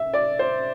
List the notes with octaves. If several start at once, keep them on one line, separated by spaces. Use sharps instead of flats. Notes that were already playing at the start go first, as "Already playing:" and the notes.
Already playing: E5
D5
C5